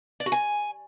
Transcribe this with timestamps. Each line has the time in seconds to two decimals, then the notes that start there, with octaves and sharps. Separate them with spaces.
0.20 D5
0.26 F#4
0.32 G#5